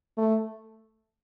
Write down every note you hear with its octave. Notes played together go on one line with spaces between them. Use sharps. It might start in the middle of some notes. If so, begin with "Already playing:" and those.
A3